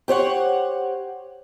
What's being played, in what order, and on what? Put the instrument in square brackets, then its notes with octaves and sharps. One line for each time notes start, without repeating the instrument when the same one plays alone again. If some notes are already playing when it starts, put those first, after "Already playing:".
[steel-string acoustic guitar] G4 C5 C#5 F#5